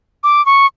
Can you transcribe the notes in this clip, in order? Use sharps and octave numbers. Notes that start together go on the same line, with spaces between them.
D6
C#6